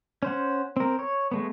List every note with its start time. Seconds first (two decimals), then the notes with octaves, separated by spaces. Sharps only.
0.23 C#4 C5 F#5
0.77 C4 A#4
0.99 C#5
1.32 G#3 A3 B3